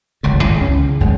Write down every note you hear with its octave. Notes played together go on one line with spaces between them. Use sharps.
F#1 C#2 A2
G#1 F#2 C#3 E3
C#2 C#4
C#3
G#1 F#2 G#3 A3